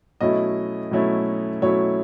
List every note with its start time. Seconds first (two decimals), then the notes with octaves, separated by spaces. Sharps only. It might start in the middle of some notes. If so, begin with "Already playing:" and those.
0.21 B2 F#3 A3 C#4 E4 D#5
0.91 B2 F#3 A3 C#4 E4
1.62 B2 F#3 A3 C#4 E4 C#5